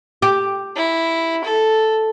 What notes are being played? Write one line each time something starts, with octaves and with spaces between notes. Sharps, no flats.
G4
E4
A4